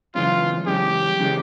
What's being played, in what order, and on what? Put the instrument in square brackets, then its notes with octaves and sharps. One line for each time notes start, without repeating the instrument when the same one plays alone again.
[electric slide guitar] F#2 C#3 E3 G#3 C#4 [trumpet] F4
[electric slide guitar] F#2 C#3 E3 G#3 C#4 [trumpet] G4
[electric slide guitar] C#3 E3 G#3 C#4